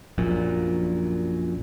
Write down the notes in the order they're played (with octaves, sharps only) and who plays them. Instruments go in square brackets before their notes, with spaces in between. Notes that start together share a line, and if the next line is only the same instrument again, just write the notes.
[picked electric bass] A#1 F#2 A#2